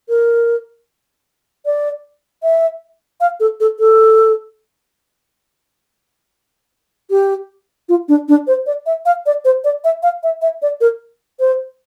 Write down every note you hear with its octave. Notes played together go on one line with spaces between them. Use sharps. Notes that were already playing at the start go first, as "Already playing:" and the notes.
A#4
D5
E5
F5
A4
A4
A4
G4
F4
D4
D4
C5
D5
E5
F5
D5
C5
D5
E5
F5
E5
E5
D5
A#4
C5